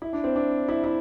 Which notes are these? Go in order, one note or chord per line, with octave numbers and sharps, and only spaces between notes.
E4
D4
C4
D4
E4
E4